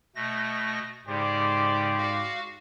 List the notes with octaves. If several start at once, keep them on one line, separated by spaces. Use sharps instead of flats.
B2 A3 A#6
G#2 C#3 G4 C5 D5
F#4 F5